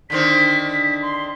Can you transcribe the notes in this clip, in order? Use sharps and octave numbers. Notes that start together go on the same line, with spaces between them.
D3 D#3 C4 B6
C6